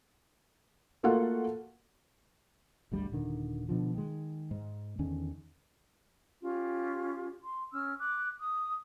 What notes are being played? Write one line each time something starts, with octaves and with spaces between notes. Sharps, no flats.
A3 A#3 F4 F#4 A4 F#5
G#1 D2 G3
D#1 D3 D#3
B2 D3 F3
D#3 G#3
G#2
E2 D3 D#3 C#4
C#4 F4 G4
C6
C#4 E6 F6
D6 F#6
D#6